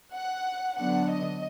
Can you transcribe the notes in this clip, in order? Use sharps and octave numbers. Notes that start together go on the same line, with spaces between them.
F#5
D3 F#3 B3 D4 F#5
D#5